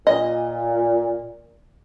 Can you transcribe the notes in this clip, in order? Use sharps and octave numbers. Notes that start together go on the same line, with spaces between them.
A#2 D#5